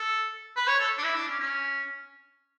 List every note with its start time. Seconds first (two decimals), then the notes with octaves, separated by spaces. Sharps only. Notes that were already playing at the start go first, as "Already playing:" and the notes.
Already playing: A4
0.57 B4
0.67 C#5
0.80 A4
0.98 D4
1.04 E4
1.15 D4
1.27 C#4
1.39 C#4